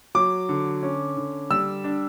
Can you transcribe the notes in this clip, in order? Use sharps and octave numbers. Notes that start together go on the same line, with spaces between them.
F#3 D6
D3
C#4
D3
G3 E6
D4